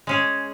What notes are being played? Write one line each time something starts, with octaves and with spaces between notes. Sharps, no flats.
G#3 C#4 G#4